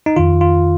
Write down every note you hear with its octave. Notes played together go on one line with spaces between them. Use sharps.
D#4
F2 D#3 F4
F4